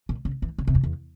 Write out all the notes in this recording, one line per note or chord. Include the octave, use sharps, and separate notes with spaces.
A#2
C#3
E3
C#3
C3
F2
E2